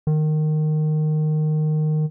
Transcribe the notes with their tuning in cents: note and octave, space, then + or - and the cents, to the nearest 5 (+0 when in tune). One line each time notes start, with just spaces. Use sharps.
D#3 -15